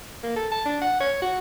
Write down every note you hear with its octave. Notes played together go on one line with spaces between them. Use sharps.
A#3
A4
A5
D4
F#5
C#5
F#4